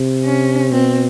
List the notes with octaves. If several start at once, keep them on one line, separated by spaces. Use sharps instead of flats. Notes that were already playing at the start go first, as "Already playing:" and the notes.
Already playing: C3
C#4
B2 C4